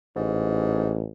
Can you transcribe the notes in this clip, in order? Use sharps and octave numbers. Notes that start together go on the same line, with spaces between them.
A1 G#2